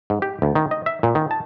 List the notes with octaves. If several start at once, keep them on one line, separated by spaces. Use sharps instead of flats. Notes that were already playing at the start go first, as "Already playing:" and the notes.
G#2
G4
D2
D#3
D#5
E5
A#2
D#3
A5